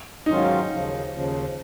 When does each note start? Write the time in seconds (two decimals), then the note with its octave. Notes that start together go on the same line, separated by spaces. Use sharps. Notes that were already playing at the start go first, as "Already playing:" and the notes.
0.26 G#2 D#3 F#3 C#4 D#4 F4
0.69 D#2 C#3 F3
1.11 D#2 C#3 F3